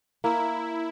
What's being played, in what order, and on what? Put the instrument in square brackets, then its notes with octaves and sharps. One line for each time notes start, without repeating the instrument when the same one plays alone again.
[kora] A#3 [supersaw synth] E4